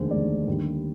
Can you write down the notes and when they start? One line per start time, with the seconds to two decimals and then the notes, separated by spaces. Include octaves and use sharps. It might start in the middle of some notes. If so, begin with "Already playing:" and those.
Already playing: F1 D#2 D3 G#3 C5
0.11 F1 D#2 D3 G#3 D5
0.48 D#2 D3 G3